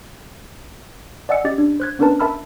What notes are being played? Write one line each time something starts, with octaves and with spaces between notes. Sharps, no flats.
D5 D#5 F#5 G#5 E6 C#7
C#4 G4 D#5 D6 A6
D4
C5 F#6 G#6
B3 C#4 D4 A#4 B4 A5
A#4 E5 A5 B5 E6 F6